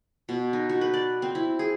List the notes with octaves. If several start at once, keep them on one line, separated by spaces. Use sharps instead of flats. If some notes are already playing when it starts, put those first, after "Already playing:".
B2
D#4
F#4
B4
D5
C4
E4
G#4